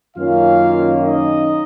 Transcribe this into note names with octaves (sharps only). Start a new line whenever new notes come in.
F#2 D#3 A#3 C#4 F4 F5
D#4 D#5